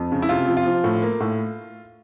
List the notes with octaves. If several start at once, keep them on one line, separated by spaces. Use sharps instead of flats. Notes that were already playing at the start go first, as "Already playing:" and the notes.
Already playing: F2
C#3
E4
C3 F4
F3
F4
F3
A2
A#3
A2